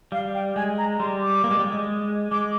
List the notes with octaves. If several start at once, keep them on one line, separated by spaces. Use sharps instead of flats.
G3 F5
G5
G#3 G#5
A#5
G3 C6
D6
A#3
G#3
G3
G#3
G#3 D6